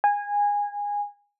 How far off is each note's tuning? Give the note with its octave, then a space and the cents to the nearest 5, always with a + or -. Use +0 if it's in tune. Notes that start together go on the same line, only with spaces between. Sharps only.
G#5 -20